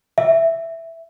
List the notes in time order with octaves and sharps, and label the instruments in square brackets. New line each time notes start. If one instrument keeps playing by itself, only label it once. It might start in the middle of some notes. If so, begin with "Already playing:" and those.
[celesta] E5